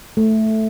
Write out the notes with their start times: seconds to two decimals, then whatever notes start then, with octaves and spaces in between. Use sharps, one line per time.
0.17 A3